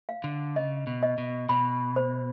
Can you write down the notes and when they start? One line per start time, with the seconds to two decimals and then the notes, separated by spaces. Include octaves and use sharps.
0.09 F5
0.24 D3
0.56 C#3 D#5
0.87 B2
1.03 D#5
1.18 B2
1.49 B2 B5
1.96 C5